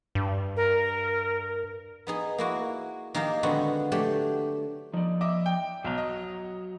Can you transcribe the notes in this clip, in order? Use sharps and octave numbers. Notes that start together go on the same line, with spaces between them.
G2
A#4
B3 D#4 G#4
A#3 E4 F#4
D#3 A#3 D#4 G4 D#5 F5
D3 G#3 B3 C4 F#4
F#3 A3 D4 G4
F3 D#4 D5
D#5 E5 D6
G5
B1 F#3 A#5
D#5